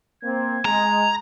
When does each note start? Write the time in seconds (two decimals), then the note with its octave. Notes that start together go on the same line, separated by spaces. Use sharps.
0.23 A#3 C4 G#6
0.65 G#3 A#5